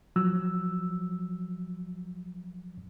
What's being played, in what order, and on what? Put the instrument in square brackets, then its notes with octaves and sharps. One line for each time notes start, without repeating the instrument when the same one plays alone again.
[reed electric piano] F3 F#3 E6